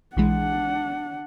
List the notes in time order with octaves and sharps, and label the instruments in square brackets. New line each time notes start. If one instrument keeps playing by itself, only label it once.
[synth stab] B1 E3 G#3 [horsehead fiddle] D4 F#5